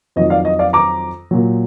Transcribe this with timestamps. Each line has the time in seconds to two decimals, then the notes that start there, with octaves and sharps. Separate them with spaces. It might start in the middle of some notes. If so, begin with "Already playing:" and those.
0.16 F2 D#3 F#3 D#5
0.30 D5 F5
0.45 D#5
0.59 D5 F5
0.73 A#5 D6
1.31 A#2 F#3